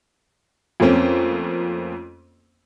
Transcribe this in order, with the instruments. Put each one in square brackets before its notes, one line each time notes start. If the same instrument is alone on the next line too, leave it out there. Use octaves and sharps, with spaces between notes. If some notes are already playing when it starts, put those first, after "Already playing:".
[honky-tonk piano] F2 A3 A#3 C4 C#4